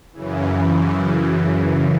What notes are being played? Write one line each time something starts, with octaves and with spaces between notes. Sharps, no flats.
F#2 C#3 E3